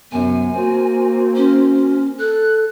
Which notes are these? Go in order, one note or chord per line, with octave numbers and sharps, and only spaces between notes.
F#2 C3 B3 G#5
A#3 C4 F#4
C#4
A4 F#6